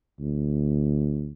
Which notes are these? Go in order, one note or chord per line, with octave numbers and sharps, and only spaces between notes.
D2